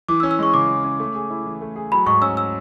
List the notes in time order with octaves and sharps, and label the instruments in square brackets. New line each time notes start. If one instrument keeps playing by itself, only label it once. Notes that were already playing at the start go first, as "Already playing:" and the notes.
[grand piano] E3 [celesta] D6
[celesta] E6
[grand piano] C#4
[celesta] E6
[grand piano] G#3 [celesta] C#6
[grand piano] C#3 [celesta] D6
[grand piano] E3
C#4
A3
G#4
E4
E3
A3
G#4
[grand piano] F#3 [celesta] B5
[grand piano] G#2 [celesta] C#6
[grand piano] C#4 [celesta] E6
[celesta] E6